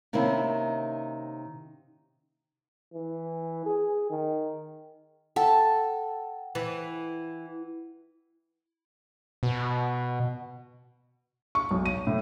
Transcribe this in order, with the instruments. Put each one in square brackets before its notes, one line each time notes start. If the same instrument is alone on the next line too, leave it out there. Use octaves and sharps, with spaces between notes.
[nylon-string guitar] C3 D#3 A#3 C#4 E4
[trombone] E3
G#4
D#3
[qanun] A4 [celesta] F#5 G5
[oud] E3
[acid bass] B2
[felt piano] C#6
B1
D#7
A2